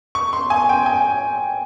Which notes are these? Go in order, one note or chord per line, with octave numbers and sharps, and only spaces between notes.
C#6
C6
G#5
G5
G#5